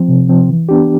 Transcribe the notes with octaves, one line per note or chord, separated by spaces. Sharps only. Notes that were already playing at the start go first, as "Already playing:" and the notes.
Already playing: F3 C4
C3
F3 C4
E3
B3 D4 G4